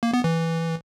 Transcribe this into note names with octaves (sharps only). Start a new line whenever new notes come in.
A#3
B3
E3